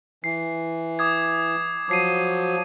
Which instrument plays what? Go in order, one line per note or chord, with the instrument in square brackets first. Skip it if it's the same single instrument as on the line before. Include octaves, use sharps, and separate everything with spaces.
[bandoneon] E3 [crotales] C7
[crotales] D6 D#6 G#6
[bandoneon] F3 F#3 [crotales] D6 C7 D#7